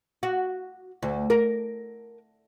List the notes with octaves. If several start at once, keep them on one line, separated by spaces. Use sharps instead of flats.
F#4
D2
A#4